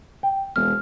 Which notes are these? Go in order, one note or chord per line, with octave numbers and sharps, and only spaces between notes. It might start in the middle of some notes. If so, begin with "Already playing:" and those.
G5
E1 F6